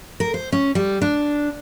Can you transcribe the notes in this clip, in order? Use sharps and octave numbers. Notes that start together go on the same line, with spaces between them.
A#4
C5
C#4
G3
D4